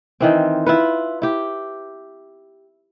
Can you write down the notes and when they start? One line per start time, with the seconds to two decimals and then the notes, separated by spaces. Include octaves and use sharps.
0.20 D#3 E3 C4
0.66 E4 F4 B4
1.22 E4 G4